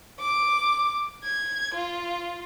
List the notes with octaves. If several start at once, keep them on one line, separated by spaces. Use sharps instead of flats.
D6
G#6
F4